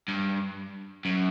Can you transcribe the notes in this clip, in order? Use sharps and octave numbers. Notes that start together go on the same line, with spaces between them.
G2
F#2